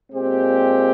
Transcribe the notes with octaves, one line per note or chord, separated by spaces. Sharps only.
A#2 G#3 C4 G4